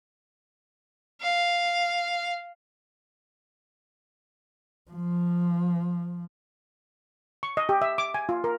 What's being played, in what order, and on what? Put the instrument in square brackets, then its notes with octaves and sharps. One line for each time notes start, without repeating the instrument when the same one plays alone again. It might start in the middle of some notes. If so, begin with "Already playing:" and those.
[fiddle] F5
[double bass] F3
[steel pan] C#6
D#5
G4
E5
D6
G#5
F4
A#4